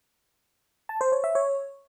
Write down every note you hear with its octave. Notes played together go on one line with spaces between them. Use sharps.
A5
C5
C#5
E5
C#5